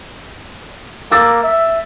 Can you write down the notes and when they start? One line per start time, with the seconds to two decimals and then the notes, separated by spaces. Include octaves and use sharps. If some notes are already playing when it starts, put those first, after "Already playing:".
1.12 A#3 D6 E6 A6
1.44 E5